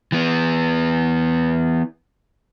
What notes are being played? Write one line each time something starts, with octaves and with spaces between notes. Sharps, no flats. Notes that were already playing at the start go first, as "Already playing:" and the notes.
E3 B3